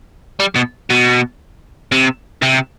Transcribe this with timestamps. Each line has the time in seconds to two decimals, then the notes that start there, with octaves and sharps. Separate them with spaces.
0.40 G3
0.56 B2
0.90 B2
1.92 C3
2.42 C3